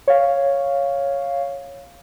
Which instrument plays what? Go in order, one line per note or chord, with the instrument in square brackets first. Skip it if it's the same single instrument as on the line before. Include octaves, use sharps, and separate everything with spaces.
[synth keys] C#5 F5